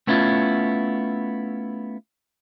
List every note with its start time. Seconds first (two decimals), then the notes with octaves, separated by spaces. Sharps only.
0.07 A3 B3 C#4 E4 F4